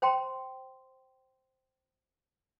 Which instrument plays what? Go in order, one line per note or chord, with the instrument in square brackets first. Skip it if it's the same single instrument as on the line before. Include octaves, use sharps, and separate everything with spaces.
[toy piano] C5 G5 A#5 C6